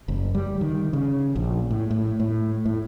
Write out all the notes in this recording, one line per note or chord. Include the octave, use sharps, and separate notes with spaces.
F#1
G3
D#3
C#3
A#1
A2
A2
A2
A2